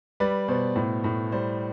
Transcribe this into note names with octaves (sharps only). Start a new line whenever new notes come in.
G3 B4 D5
B2 C5
A2
A2
G3 C5